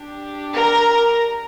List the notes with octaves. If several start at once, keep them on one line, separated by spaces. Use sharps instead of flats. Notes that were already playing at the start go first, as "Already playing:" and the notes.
Already playing: D4 G4
A#4 A#5